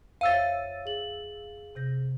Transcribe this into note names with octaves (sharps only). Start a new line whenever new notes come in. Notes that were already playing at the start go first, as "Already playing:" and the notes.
F2 C5 C#5 E5 F5 E6 A6 D#7
G#4 F#7
C3 G6 A#6